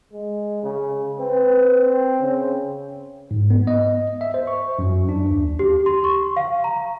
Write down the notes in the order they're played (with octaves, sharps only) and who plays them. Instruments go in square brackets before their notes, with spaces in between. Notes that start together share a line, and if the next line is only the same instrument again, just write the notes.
[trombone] G#3
C#3
[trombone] C4 [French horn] B4
[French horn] C#3
[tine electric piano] G#2
B3
D#5
E5
C5
C#6
F#2
D4
D#2
[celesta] G4
C6
C#6
F5
A#5